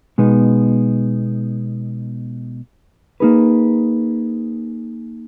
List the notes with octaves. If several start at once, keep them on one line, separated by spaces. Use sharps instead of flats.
B2 G#3 B3 D#4
A#3 D#4 G#4 B4